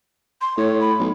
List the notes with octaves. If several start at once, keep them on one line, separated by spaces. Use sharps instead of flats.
C6
A2 C#5
B5
B1